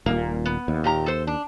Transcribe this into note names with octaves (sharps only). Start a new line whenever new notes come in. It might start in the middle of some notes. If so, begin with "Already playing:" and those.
D#1 A#2 A#3
B3
D#2
A#2 G4 A#5
A4 C5
D4